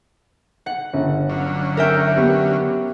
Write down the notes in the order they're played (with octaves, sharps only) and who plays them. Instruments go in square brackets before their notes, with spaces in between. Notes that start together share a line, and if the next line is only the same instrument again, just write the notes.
[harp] F#5
[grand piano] G1
[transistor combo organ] D3 F#3 C#4
[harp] A#4 E5 G5
[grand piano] B3 G4